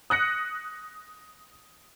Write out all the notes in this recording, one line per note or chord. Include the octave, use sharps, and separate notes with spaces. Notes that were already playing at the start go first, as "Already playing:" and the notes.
D#6 F#6 A#6 C#7